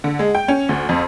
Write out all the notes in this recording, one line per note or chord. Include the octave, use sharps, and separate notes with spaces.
D3
G#3
G5
C#4
D2
F2